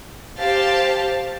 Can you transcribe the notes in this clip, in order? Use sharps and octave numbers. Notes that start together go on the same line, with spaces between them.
G4 C5 F5 A5